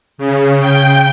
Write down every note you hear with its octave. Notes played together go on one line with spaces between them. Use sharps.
C#3
G5